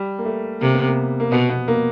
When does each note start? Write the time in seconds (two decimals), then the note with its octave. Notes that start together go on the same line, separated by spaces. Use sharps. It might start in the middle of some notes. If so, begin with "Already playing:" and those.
Already playing: G3
0.19 A#3
0.25 A3
0.61 C3 A#3
0.75 B3
0.88 A#3
1.20 A#3
1.31 B2 B3
1.49 B3
1.68 A#3